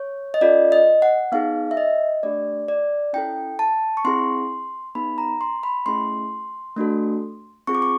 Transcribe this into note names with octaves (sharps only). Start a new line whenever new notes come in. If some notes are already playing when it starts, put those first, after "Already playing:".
Already playing: C#5
D#5
C#4 F4 A4 D5
D#5
F#5
B3 D#4 G#4 F5
E5
D#5
A3 D4 G4 D5
D5
C#4 E4 A4 G5
A5
C#6
C4 E4 G#4 C6
B3 D#4 G#4 B5
A#5
C6
B5
A3 C#4 E4 G#4 C6
A3 D4 F#4 A4
C4 F4 G#4 C#6
D6
C#6